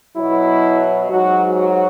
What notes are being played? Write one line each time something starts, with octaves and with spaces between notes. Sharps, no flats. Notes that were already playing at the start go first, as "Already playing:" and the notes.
B2 F#3 E4
G#2 F#3 F#4
F#4